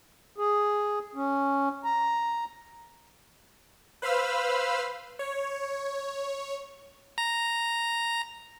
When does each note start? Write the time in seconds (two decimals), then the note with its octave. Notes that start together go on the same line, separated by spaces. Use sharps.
0.38 G#4
1.15 C#4
1.84 A#5
4.02 B4 C5 F5 B5 E6 F6
5.19 C#5
7.18 A#5